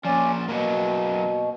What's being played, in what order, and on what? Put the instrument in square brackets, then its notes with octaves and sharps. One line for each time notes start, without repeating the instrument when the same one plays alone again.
[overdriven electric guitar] A#2 F3 [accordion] C#4 D5
[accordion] B2 [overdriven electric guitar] F#3 A#3